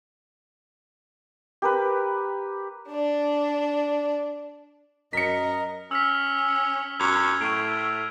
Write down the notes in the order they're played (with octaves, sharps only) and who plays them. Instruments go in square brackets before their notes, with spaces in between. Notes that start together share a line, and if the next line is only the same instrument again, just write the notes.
[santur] G4 A#4 B4
[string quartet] D4 D5
[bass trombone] F#2 [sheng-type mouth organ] A#4 [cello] D#5 [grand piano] B6 C#7
[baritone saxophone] C#4 [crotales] E6 F6 B6
[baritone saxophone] F#2 [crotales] G#6 F7
[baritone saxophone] A2 [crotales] C#6 D7